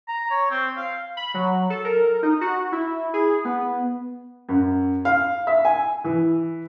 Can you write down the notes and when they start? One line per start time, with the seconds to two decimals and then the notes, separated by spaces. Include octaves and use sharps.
0.09 A#5
0.31 C#5
0.50 C4
0.77 F5
1.17 B5
1.34 F#3
1.70 A4
1.84 A#4
2.23 D#4
2.41 F#4
2.72 E4
3.14 G#4
3.45 B3
4.49 F#2
5.05 F5
5.47 E5
5.65 G#5
6.04 E3